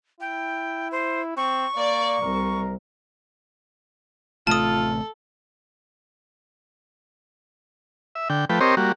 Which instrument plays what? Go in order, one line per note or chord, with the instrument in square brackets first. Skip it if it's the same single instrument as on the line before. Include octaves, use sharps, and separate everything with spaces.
[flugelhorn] E4 [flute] G5
[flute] C5
[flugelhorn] C4 [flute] C#6
[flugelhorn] A#3 [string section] D5
[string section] C2 [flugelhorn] A#4
[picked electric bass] A1 C3 A3 [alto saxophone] F4 [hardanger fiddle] A4 [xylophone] A5 D#6
[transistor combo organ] E5
D3 G5
F3 A3 B4 G5
C4 G4 A#4 C5 C#5 D#5
G3 A#3 F#4